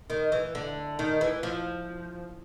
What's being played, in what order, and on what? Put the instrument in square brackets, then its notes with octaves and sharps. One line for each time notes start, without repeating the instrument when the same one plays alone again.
[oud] D#3
E3
D3
D#3
E3
F3